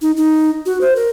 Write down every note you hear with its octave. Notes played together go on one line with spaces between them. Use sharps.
D#4
D#4
F#4
C5
A#4